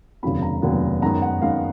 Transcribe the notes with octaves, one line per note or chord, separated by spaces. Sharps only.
F1 D#2 C#3 F#3 B3 B5
A#5
F1 D#2 C#3 F#3 B3
F#2 D#3 G#3 B3 A#5
F#5
F#2 D#3 G#3 B3 F5